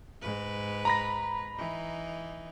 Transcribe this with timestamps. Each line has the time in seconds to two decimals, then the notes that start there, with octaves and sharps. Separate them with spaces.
0.22 G#2 B4
0.85 A#5 B5 A#6
1.56 E3 D#4